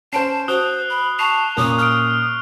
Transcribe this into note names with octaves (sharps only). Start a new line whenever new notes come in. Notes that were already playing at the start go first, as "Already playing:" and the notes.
C#4 C5 A5 C7 D7
F#4 C5 D#6 F#6 G7
B5
A5 C#6 C7 F7
A#2 C#4 A#4 D#6
D#6 F6 D7